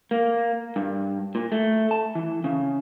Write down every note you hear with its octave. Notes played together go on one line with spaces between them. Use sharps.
A#3
G2
A#2
A3
A5
E3
C#3